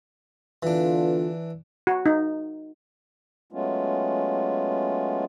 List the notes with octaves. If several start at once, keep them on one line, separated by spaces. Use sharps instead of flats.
D3 E3 B3 D4 F4
F#4
D#4
F#3 G#3 A3 B3 C#4 F4